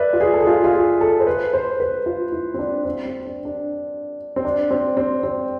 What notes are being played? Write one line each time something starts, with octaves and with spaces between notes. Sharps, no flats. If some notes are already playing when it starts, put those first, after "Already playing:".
Already playing: B4 D5 E5
F4
G#4
A4
G#4
F4
F4
G#4
A4
C5
B4
C5
B4
F4
E4
C4
D4
C4
C4
D4
D4
C4
D4
C4
C4
C4